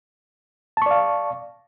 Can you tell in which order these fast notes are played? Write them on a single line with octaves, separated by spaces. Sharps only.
A5 C#6 D5 F5